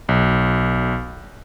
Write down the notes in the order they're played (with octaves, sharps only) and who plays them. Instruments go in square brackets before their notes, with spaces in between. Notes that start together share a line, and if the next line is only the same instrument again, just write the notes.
[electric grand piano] B1